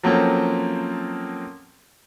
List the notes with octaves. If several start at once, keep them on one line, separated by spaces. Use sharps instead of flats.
F3 F#3 A#3 C4 C#4 A4